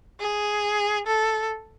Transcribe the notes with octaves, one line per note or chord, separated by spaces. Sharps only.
G#4
A4